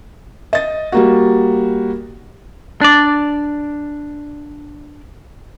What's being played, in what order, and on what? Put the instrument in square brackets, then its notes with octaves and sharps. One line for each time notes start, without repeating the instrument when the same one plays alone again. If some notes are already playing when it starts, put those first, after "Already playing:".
[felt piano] D#5 A6
G3 A#3 F#4
[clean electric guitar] D4 D5